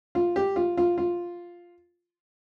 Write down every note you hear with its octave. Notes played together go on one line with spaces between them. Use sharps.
F4
G4
F4
F4
F4